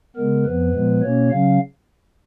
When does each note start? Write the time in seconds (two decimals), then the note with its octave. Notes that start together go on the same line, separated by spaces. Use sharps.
0.16 C#3 G#3 B3 A#4
0.45 F2 F3 B3 B4
0.73 A#2 F3 G#3 B3
1.01 B2 A#3 C#4 C#5
1.30 C#3 F#3 C#4 F5